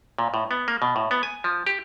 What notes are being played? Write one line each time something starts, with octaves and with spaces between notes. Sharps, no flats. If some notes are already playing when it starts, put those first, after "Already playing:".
A#2
A2
B3
A#3
B2
A2
B3
G#5
F3
G4